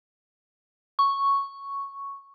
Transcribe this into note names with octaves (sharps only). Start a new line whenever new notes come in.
C#6